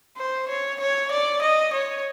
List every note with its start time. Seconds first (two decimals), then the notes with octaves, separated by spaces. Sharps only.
0.18 C5
0.49 C#5
0.80 C#5
1.11 D5
1.42 D#5
1.73 C#5